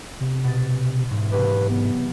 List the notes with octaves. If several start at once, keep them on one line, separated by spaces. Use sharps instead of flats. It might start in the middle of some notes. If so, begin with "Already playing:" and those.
C3
B2 A6
E1 G#2
C3 F#3 G4 B4
B3